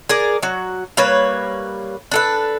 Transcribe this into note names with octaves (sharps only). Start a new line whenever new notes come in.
G#4 A#4 D5
F#3 F#4
G3 A#3 B4 C#5
D4 A4 B4